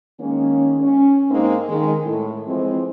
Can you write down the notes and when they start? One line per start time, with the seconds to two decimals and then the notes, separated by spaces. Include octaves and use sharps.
0.19 D#3 G#3 A#3 C#4
0.80 C#4
1.30 G#2 G#3 A#3 C4 D#4
1.68 D#3 G#3
2.04 A2
2.47 E3 F3 G#3 C4